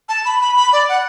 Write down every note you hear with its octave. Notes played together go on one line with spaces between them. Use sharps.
A5
B5
B5
B5
D5
F#5